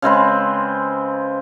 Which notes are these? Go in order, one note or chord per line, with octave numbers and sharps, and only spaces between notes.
C#3 G#3 C4 B4